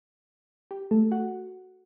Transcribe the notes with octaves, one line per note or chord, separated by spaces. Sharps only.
G4
A3 A4
F#4 F#5